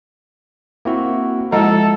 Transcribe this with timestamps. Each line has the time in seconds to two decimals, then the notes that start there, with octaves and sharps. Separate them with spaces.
0.85 A#3 C4 E4 F#4
1.52 F3 G#3 E4 A4 D#5 A#5